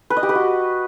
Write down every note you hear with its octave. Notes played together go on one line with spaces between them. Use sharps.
B4
D#5
G4
B4
F#4